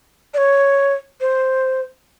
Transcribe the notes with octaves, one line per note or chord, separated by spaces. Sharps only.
D5
C#5
C5